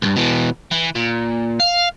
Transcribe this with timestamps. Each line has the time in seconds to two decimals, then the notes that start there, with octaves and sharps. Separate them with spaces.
0.02 C#2 G2
0.16 B2 E3
0.71 E3
0.95 A#2
1.60 F5